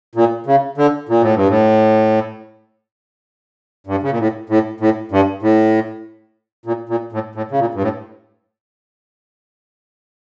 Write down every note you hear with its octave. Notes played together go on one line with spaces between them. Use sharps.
A#2
C#3
D3
A#2
A2
G2
A2
G2
C#3
A#2
A2
A2
A2
G2
A2
A#2
A#2
A2
A2
C#3
A#2
G2
A2